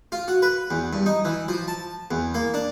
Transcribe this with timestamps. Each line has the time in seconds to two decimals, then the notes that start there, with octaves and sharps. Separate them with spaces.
0.12 F4
0.28 F#4
0.42 B4
0.71 E2
0.93 G2
1.06 D#4
1.25 E3
1.48 F3
1.68 A5
2.11 E2
2.34 A#3
2.54 D4